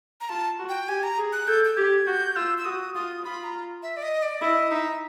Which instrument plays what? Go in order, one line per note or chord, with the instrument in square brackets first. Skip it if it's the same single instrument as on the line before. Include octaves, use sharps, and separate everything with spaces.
[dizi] A#5
[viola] F4 [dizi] A5
[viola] F#4
[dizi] G5
[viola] G4 [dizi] G#5
[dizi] A#5
[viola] G#4
[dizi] F#6
[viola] A4 [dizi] G6
[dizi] G6
[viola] G4 [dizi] G#6
[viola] F#4 [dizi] G6
[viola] F4 [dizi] E6
[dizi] E6
[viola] F#4 [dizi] D#6
[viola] F4 [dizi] D#6
[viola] F4 [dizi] B5
[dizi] A#5
E5
D5
D#5
D5
[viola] E4 [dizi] D#5
[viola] D#4 [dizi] E5